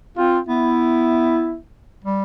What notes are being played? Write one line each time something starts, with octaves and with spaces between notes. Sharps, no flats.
C4 F4
B3 E4
G3